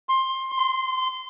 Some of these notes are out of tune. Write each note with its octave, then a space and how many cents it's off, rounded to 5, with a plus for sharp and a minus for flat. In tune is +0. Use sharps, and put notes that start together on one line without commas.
C6 +15
C6 -20